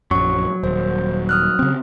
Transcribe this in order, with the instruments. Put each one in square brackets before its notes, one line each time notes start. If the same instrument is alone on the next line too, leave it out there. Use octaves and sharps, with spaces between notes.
[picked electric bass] A#1 F#2 [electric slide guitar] F#3 [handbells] C#6
[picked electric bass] D#1 [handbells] C5
[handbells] D#6 F6 F#6
[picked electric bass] C#3 C4